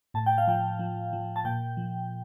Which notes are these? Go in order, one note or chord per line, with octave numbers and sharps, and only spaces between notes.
A2 A5
G5
F5
F3 G5
F3
F3
A5
A#2 G5
F3